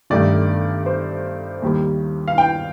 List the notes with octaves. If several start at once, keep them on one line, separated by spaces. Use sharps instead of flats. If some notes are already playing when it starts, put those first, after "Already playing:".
G1 G2 D#3 A3 D5
C5
D#2 D#3 G3 A#3
F5
G5